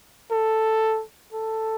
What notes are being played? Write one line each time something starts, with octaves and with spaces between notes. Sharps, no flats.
A4
A4